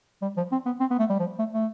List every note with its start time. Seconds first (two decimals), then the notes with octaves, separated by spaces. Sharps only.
0.22 G3
0.37 F3
0.52 C4
0.66 B3
0.80 C4
0.90 B3
0.99 A3
1.10 G3
1.20 F3
1.39 A3
1.53 A3